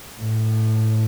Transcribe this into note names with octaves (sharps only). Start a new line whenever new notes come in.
A2